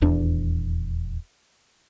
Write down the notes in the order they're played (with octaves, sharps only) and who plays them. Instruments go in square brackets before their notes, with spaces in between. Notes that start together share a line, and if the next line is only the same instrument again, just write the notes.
[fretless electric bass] D#1 E2 D4